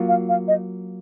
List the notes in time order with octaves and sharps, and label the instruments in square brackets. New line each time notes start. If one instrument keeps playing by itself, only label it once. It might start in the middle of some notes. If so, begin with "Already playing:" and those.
Already playing: [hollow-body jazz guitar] F#3 A#3 F4
[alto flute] F5
F5
D#5